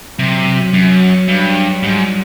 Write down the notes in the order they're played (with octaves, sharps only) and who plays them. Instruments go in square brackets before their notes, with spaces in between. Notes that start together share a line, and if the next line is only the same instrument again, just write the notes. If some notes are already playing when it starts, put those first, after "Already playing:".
[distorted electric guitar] C3 [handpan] F#3
[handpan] F#3
[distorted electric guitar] F#2 [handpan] F#3
[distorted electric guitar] G2
[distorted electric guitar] G#2 [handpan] G3